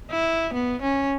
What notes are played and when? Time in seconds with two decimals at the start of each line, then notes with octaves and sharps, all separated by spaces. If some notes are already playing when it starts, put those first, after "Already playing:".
0.11 E4
0.54 B3
0.82 C#4